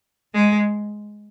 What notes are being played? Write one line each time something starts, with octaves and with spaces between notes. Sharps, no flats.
G#3